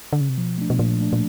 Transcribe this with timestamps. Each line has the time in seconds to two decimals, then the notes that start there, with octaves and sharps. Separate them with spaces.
0.13 D3
0.21 C#3
0.29 C3
0.37 B2 F3
0.58 A3 D4
0.70 B2
0.79 A#2 F3
1.00 A3 D4
1.13 A#2